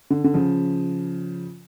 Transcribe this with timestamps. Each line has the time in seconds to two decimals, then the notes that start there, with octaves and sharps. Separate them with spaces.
0.10 D3
0.24 D3
0.34 C#3 F3